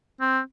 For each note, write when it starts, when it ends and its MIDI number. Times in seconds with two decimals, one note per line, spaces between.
0.21 0.40 60